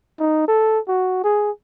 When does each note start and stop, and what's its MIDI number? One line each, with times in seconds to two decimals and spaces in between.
0.19 0.47 63
0.48 0.79 69
0.88 1.21 66
1.24 1.51 68